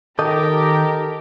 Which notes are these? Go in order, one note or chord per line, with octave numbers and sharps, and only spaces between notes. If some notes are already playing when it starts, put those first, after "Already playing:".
D#3 G4 A4 A#4 D#5 D6 G6